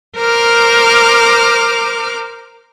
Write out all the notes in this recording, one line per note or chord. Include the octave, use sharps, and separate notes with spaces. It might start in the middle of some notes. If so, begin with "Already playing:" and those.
A#4 C5 D6 F6